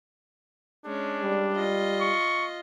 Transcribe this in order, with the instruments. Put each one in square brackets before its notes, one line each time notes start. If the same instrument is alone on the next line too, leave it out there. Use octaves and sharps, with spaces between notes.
[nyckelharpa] G#3 C#4 [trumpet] D4
[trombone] G3
[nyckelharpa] F4 D#5
[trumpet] C#6